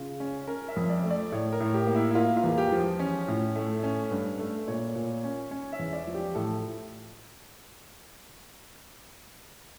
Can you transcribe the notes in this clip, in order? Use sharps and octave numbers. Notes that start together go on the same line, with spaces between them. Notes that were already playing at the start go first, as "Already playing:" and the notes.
Already playing: C#3 F4
C#4
C#4 A#4
E5
F2
D5
A3
D5
A2 C#5
A#4
A2
G4
A#3
E4
E4
A#3 F4
F4
E2
G4
F3
C#4
A2
A3
C#4
G2
A3
A#2 C#5
A#2
C#4
C#4 C#5
E5
E2
D5
F3
G4
A2 A4